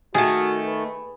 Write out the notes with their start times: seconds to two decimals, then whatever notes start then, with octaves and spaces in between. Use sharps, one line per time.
0.14 D#3 A3 F#4 G#4
0.66 B4